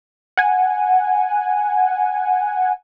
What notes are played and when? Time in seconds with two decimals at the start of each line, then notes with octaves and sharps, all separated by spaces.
0.37 F#5 G#5